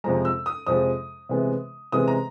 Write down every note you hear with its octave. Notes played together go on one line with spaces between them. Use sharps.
F2 C3 F3 G#3 A#5
E6
D#6
F2 C3 F3 G#3 D#6
C3 E3 G#3 B3
C3 E3 G#3 B3 D#6
A#5